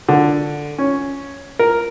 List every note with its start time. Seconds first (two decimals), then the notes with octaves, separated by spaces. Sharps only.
0.09 D3
0.78 C#4
1.59 A#4